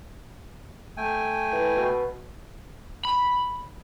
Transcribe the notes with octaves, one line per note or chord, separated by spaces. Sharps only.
A3 G5 G#5
E3
B2
B5